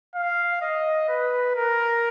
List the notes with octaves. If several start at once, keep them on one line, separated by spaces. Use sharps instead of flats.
F5
D#5
B4
A#4